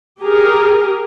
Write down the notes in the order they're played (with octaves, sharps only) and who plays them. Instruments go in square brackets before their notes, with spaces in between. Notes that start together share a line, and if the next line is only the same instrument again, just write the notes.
[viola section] G4 G#4 A#4